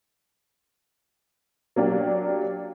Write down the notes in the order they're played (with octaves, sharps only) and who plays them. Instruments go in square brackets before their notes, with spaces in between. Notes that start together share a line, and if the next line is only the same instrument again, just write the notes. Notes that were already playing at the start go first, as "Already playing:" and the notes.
[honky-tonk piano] F#3 A#3 D4 G4